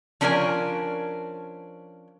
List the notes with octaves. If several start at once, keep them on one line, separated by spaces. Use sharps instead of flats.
F3 C#4 D4 A#4 C5 G#5